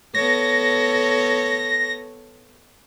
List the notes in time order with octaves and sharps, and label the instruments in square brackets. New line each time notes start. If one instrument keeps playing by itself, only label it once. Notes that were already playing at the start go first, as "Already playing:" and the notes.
[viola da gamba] B3 A4 C#5 [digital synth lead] A#6